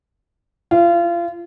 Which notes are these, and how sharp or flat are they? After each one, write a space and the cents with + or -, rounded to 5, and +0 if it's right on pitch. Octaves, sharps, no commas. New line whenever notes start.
F4 -30